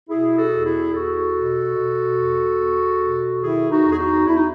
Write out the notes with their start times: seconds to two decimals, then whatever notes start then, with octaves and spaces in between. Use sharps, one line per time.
0.09 B2 E4 G#4
0.37 F#4 A4
0.50 E2
0.64 E4 G#4
0.92 E2 F#4 A4
1.34 B2
1.75 B2
2.17 E2
2.59 E2
3.01 B2
3.42 D#3 E4 G#4
3.70 D#4 F#4
3.84 E2
3.92 G#4
3.98 D#4 F#4
4.26 E2 E4
4.36 D#4